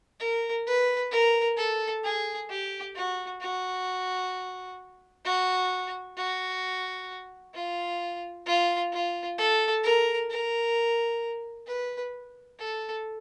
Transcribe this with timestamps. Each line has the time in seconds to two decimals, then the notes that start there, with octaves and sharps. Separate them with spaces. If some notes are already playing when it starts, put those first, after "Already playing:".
0.20 A#4
0.67 B4
1.12 A#4
1.57 A4
2.04 G#4
2.50 G4
2.96 F#4
3.41 F#4
5.25 F#4
6.17 F#4
7.54 F4
8.46 F4
8.93 F4
9.38 A4
9.84 A#4
10.30 A#4
11.67 B4
12.59 A4